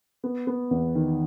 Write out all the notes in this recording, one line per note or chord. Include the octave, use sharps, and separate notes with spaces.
B3
B3
E2
D#3